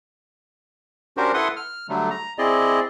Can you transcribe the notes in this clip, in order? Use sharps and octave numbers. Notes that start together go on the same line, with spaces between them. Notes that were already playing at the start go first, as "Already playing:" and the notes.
C#4 D4 F#4 G4 A#4 C5
E4 A4 B4 F#5 C6 D#6
F6
D3 F#3 G3 A3
A#5
C4 E4 G#4 D5 D#5